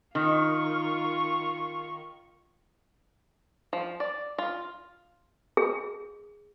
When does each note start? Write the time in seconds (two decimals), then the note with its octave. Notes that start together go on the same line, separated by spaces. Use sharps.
0.15 D#3 F4 C#6
3.73 F3
4.00 D5
4.38 F4
5.57 G#4